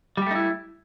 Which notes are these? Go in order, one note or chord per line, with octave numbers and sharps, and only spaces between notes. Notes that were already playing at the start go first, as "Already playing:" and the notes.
G3 A3 D#4 E4 G4